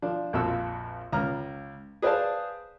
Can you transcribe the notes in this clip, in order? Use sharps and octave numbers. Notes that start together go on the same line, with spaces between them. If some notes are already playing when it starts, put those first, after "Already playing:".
F3 D4
A#1 F2 F3 F#4 E6
C#2 C#3 A#5 F6
G#4 B4 C5 D5 F5 A5